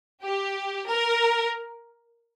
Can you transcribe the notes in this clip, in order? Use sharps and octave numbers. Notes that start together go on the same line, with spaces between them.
G4
A#4